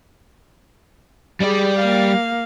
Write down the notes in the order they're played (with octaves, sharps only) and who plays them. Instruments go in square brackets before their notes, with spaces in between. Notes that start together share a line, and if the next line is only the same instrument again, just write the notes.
[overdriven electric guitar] G3 D5 [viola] G#4
[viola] A#3 F5